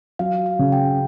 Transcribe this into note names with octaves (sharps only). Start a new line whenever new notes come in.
F#3 F5
F5
C#3
G5